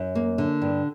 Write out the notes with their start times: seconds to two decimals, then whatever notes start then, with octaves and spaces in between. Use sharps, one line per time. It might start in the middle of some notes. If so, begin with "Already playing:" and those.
Already playing: F#2
0.15 A#3
0.38 D3
0.62 G2